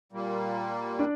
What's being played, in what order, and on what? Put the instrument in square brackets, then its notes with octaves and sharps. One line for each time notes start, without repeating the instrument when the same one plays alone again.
[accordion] A#2 G3 A#3
[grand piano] D4 D5